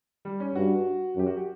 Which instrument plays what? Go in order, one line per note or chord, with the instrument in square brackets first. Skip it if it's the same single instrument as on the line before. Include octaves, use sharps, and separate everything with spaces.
[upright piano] G3
C#4
[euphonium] G2 [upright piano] F#4
[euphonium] F#2 [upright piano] G4
[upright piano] F#4
G4